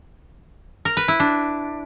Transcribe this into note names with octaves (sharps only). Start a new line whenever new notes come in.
A#4
B4
E4
D4